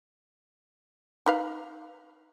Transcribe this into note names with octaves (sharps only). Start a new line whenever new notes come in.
D#4 B4 F5